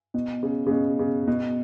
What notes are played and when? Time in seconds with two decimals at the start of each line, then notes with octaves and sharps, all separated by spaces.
0.14 B2
0.43 C#3
0.66 C#3
0.71 B2
0.99 C#3
1.27 B2